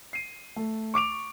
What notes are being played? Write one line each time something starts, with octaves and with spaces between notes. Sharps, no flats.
C7 D#7
A3
C#6 D6 D7 F7